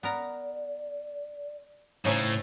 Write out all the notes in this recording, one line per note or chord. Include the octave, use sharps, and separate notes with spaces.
B3 A#4 D5 A#5
A2 C#3 C#4 D#4 C5